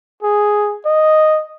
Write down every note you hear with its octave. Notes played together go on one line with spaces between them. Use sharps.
G#4
D#5